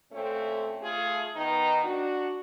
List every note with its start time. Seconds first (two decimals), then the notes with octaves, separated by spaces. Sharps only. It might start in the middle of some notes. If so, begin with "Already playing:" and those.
0.12 A#2 A3 C4 C#4
0.82 A3 F4 G#4
1.35 D#3 B3 D#4
1.85 D4 F#4